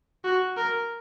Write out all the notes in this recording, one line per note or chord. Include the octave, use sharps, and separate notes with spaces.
F#4
A#4